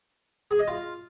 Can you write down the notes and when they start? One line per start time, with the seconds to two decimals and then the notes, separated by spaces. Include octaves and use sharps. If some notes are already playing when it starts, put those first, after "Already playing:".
0.51 G#4
0.59 D#5
0.68 F4